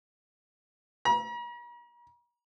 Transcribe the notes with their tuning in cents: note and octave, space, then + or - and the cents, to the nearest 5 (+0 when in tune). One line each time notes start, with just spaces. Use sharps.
A#5 +45